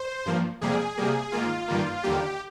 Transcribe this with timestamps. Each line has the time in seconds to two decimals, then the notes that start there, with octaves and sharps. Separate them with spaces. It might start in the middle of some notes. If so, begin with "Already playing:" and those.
Already playing: C5
0.26 G2 F3 A#3
0.61 F2 C3 G3 A#3 G#4
0.97 C3 G3 A#3
1.32 G#2 D#3 A#3 F4
1.68 G2 D#3 G3 A#3
2.03 D#2 D3 G3 A#3 G4